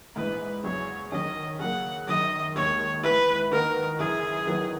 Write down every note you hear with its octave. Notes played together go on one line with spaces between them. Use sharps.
A#1 G#2 E3 B4
E2 C#3 F#3 C#5
D#3 F#3 C#4 D#5
C#3 F#3 A#3 F#5
F#2 D#3 F#3 D#5
D#2 D#3 G#3 C#5
G#2 E3 B3 E4 B4
D#3 A#3 D#4 F#4 A#4 B4
F#2 C#3 E3 G#4
D#3 F#3 B3 E4